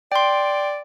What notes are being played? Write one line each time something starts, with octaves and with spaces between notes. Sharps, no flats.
D5 G5 C6